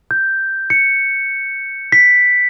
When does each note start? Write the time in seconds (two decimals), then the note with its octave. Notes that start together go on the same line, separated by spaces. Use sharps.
0.11 G6
0.70 C#7
1.92 B6